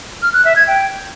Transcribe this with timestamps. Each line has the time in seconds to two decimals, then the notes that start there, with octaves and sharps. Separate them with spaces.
0.22 F6
0.34 F#6
0.45 E5
0.56 G#6
0.67 G5